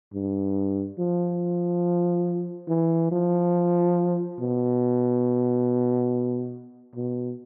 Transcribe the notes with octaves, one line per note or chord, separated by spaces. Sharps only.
G2
F3
E3
F3
B2
B2